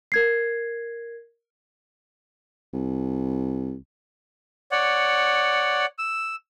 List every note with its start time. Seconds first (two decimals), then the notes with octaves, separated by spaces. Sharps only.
0.12 A#4 G#6 C7
2.74 C2
4.72 C#5 D5 F#5
5.98 E6